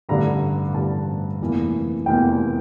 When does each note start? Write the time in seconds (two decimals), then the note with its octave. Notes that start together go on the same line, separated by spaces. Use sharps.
0.09 A1 G2 D3 A#5
0.74 A1 G2 D3 A5
1.41 F1 E2 E3 A#3
2.06 F1 E2 E3 A#3 G5